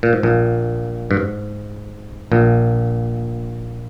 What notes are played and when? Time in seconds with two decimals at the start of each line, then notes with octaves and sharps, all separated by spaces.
0.03 A#2
0.13 G#2
0.23 A#1 A#2
1.11 G2
1.17 G#2
2.32 A#1 A#2